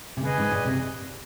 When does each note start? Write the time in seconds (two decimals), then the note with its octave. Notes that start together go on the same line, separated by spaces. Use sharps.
0.17 C3
0.23 C#3 G#4 B4 D#5 G#5
0.38 G#2
0.52 A#2
0.65 C3